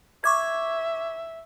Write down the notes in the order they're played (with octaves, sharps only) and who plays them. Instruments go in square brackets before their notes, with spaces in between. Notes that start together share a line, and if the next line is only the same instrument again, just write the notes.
[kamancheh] E5 [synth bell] C#6 D6 G#6